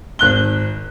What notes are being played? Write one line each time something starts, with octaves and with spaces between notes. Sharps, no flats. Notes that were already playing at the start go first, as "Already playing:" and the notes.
G#1 F#6 G7